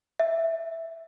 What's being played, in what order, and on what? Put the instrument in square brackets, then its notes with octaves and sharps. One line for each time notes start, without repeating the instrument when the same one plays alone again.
[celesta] E5